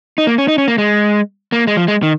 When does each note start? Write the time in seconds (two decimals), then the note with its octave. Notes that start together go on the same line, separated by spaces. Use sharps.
0.18 D#4
0.27 A#3
0.38 C#4
0.48 D#4
0.58 C#4
0.68 A#3
0.78 G#3
1.52 A#3
1.67 G#3
1.77 F3
1.88 G#3
2.03 D#3